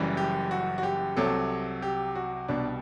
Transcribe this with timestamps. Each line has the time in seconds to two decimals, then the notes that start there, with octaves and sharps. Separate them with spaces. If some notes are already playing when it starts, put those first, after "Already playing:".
Already playing: F#1 F#2 E3 G3
0.17 G4
0.51 F#4
0.78 F#4
0.83 G4
1.17 C2 C3 F#3 A4
1.82 G4
2.15 F#4
2.48 C2 B2 G3 D4